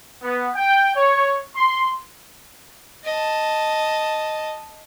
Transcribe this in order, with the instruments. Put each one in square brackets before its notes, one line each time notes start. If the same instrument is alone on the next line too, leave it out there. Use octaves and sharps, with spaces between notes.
[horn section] B3
G5
C#5
C6
[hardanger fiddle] D#5 A5